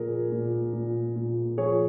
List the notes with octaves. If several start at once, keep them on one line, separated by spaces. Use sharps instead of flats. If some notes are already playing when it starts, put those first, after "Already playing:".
Already playing: A#2 F3 G#4 A#4
A#2
A#2
A#2
F3 G#4 C#5